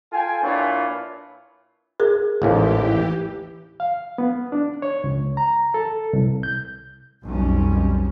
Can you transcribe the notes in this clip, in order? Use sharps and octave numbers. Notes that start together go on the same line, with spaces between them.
F4 A4 G5 G#5
A#2 D4 E4 F4 B4 C#5
G#4 A#4
A1 D#2 G#2 E3 G4
F5
B3
D4
C#5
C#2
A#5
A4
C2
G6
B1 F2 D#3 G3 C#4